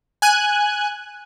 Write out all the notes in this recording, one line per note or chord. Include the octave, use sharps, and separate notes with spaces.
G#5 F#6 G#6